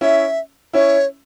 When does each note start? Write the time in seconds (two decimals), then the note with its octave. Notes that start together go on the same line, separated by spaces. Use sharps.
0.01 C#4 E4 E5
0.73 C#4 E4 C#5